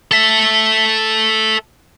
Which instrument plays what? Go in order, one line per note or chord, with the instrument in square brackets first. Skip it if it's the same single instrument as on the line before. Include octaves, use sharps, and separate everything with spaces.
[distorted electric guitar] A4 E5